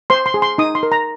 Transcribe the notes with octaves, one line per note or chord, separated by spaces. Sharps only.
C5 C6
C6
G#4
C6
D#4 D#6
C6
A#4
A#5